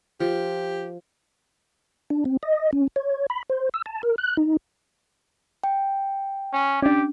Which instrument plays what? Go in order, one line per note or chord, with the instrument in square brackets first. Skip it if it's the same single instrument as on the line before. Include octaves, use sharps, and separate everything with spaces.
[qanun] F3 [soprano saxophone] G4
[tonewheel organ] D4
C4
D#5
C#4
C#5
B5
C5
E6
A5
A#4
F#6
D#4
[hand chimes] G5
[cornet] C#4
[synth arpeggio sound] C#4 D4 [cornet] G4